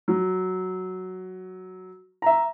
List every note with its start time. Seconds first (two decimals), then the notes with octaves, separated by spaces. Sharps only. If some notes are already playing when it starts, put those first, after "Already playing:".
0.08 F#3
2.22 E5 A#5